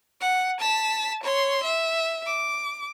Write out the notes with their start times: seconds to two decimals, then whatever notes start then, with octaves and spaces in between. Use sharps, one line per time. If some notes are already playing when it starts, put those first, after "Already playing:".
0.21 F#5
0.60 A5 B6
1.23 C#5 C6
1.63 E5
2.26 D6